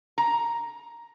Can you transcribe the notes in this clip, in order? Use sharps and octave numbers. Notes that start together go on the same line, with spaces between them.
A#5